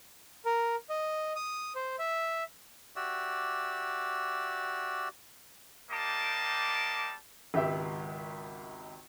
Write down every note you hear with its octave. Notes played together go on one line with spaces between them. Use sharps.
A#4
D#5
D#6
C5
E5
F#4 G4 D5 E5
G3 A#3 G4 D#5 A5 D6
G#1 C#2 G4 E5